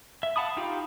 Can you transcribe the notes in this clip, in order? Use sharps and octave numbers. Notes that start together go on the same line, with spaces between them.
E5
F5 F#5 A5 B5 D#6
D#4 F4 G4 F5 G5